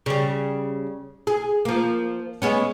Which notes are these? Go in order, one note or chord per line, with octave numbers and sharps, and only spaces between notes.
C#3 G3
G#4
F3 A#3
G#3 B3 C#4